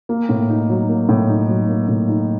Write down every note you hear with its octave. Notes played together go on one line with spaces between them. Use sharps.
A#3
A2
D#4
F#3
A#3
A2
D#4
F#3
A#3
A2
D#4